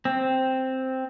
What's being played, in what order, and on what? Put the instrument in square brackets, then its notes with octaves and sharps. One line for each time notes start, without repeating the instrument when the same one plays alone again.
[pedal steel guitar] C4